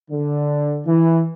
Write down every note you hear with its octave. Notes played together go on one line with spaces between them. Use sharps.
D3
E3